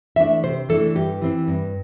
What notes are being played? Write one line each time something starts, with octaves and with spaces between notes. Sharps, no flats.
E3 A3 D4 E5
C3 C5
E3 A3 D4 A4
G2 G4
E3 C4
G2